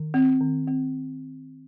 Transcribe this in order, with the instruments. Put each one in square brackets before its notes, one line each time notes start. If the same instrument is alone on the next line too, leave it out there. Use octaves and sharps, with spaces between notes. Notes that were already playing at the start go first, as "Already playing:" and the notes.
Already playing: [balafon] D#3
C4
D#3
C4